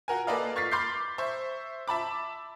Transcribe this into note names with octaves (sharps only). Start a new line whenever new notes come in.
F4 F#4 A#4 G#5
A#3 A4 B4 D5 D#5 F5
C#6 F6 A6 B6 C7
B5 C6 D6 F6 G6 C7
C5 E5 C#6
E5 A5 B5 D6